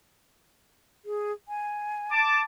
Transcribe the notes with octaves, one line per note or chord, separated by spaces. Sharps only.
G#4
G#5
A5 D6